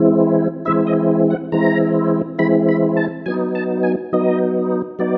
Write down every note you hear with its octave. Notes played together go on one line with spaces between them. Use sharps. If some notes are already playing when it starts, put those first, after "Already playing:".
Already playing: E3 G#3 C4 E4
E3 G#3 C4 E4 E5
D#5
F#5
E3 G#3 C4 E4 A#5
E3 G#3 C4 E4 B5
B5
A5
F#3 B3 D#4 G#5
A5
G#5
F#3 B3 D#4 D#5
F#3 B3 D#4 D5